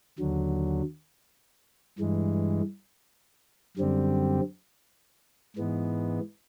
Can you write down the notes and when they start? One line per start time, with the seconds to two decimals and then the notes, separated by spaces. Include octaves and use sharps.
0.19 D#2 D3 F#3
1.99 G2 E3 G#3
3.77 F#2 D3 G3 C4
5.56 G#2 E3 G#3 B3